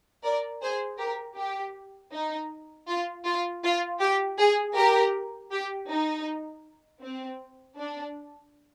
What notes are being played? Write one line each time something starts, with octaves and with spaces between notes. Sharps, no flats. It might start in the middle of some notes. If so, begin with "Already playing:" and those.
A#4 D5
G#4 C5
G4 A#4
G4
D#4
F4
F4
F4
G4
G#4
G4 A#4
G4
D#4
C4
D4